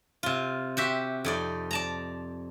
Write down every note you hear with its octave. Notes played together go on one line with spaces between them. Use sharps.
C3 F4
F#4 G4 E5
F2 D#4 D5
D5 A5 A#5